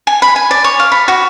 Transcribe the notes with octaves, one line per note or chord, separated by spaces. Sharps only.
G#5
B5
G#5
D5
C#5
F5
B5
F#4